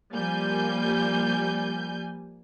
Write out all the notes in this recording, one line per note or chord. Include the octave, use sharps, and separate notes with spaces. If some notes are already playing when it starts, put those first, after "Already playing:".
F3 G3 A#3 G#5 G6